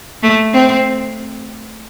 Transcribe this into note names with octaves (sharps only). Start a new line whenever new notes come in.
A3
C4